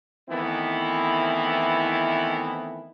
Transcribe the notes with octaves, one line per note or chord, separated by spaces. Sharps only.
D#3 E3 A3 B3 C4 E4